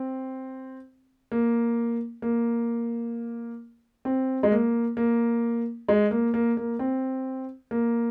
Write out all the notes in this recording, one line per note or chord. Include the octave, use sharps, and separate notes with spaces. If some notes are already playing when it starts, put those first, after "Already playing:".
Already playing: C4
A#3
A#3
C4
G#3
A#3
A#3
G#3
A#3
A#3
A#3
C4
A#3